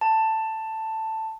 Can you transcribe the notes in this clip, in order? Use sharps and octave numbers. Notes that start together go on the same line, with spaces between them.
A5